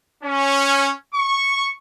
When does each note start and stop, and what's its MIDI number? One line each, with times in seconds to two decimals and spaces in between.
0.24 0.92 61
1.14 1.70 85